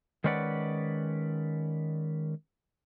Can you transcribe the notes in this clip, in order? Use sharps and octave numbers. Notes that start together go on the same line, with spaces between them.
D#3 G#3 C#4 B4 D5 F#5